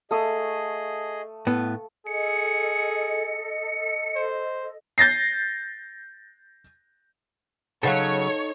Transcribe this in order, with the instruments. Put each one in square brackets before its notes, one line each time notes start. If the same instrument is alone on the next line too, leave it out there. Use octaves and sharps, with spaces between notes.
[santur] A3 F5 D#6 [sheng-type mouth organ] G#4 D#5
[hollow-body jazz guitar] A2 B3
[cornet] G#4 [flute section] A4 D#5 [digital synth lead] C#7
[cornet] C5
[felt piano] G6 A6 A#6 C7
[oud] C#3 F#3 [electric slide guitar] D#4 A4 [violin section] C#5 [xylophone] F5 F#5 A6